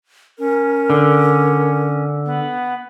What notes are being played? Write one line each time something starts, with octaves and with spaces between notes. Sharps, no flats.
C#4 A#4
D3
B3